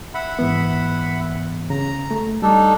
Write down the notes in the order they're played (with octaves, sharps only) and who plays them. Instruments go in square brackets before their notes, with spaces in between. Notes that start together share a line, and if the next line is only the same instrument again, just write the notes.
[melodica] E5 F#5 B5
[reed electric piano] G#2 E3 B3
[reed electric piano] C#3 [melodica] A#5
[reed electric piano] A3
[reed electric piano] G3 [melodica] D4 D#4 A4